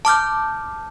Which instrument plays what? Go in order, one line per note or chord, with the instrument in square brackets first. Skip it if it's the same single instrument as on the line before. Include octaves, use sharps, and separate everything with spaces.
[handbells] A5 D6 F6 G6